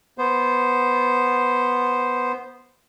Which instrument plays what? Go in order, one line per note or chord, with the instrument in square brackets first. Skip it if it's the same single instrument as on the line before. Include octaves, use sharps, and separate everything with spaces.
[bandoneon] B3 C5